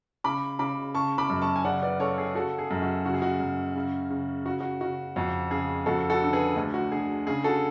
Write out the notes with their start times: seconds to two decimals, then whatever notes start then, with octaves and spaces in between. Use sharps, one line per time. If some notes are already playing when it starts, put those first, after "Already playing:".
0.24 C#3 B5 D6
0.59 C#3 B5 D6
0.95 C#3 A5 C#6
1.18 B5 D6
1.30 F#2
1.42 A5 C#6
1.56 G#5
1.65 C#3 D5 F#5
1.83 B4 D5
2.00 C#3 A4 C#5
2.18 G#4
2.35 C#3 F#4 A4
2.58 G#4
2.71 F#2
2.82 F#4
3.05 C#3 F#4
3.14 G#4
3.22 F#4
3.40 F#2
3.76 C#3
4.10 C#3
4.46 C#3 F#4
4.61 F#4
4.81 C#3 F#4
5.16 F2 F#4
5.51 C#3 G#4
5.86 F2 F#4 A4
6.10 F#4 A4
6.22 D3
6.33 G#4 B4
6.56 D2
6.74 F#4
6.92 D3 G#4
7.27 C#3 G#4
7.44 F#4 A4